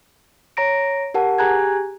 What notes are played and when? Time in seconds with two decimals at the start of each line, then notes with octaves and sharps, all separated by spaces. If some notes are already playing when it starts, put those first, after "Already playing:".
0.57 C#5 A#5 A#6 D7
1.14 G4 A#4 F#5 A5
1.38 G4 G#4 G#5 A#5 F#6 G#6